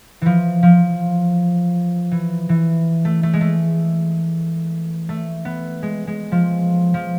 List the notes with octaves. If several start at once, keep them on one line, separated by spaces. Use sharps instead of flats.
E3 F3
F3
E3
E3
A3
A3
G#3
A3
A3
B3
G#3
G#3
F3
F3